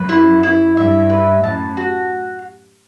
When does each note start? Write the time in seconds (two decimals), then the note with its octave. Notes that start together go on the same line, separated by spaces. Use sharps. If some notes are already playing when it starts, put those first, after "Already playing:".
Already playing: F#2 B4
0.09 E4
0.43 E4
0.77 G2 E5
1.10 B4
1.43 F#2 A2 A5
1.77 F#4